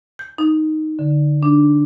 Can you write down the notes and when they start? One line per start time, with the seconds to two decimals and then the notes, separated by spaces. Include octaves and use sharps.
0.19 G6
0.38 D#4
0.99 D3
1.43 D4